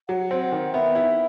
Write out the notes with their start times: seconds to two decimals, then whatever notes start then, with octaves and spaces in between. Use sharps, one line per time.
0.08 F#3 F#5
0.31 C4
0.52 D#3
0.73 B3 E5
0.95 E4